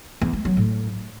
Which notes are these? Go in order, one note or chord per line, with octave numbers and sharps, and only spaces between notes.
E2
G#3
F#3
A2